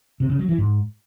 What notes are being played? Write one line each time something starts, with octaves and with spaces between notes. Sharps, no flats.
C3
C#3
F#3
E3
G#2